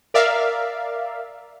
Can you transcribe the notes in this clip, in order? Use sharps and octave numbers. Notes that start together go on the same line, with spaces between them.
A#4 D5 E5 F5